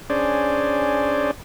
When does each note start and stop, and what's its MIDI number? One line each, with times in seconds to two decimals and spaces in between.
0.10 1.31 61
0.10 1.31 62
0.10 1.31 68
0.10 1.31 72
0.10 1.31 74